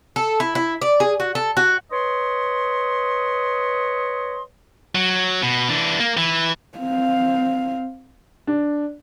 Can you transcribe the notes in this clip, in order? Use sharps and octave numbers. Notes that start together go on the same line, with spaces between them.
A4
E4
E4
D5
G#4
F#4
A4
F#4
B4 C#5 D#5 C6
F#3
B2
E3 D4
A#3
E3
C4 F5
D4